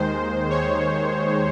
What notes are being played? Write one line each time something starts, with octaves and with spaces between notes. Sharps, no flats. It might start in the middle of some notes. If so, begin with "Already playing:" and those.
Already playing: D#2 D#3 G#3 C5
C#5